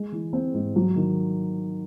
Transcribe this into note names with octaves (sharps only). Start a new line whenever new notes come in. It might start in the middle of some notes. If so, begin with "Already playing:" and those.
Already playing: G#3
E3
C4
G#2
F#3
D#3